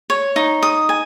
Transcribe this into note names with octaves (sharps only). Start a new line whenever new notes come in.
C#5
D#4
D#6
G#5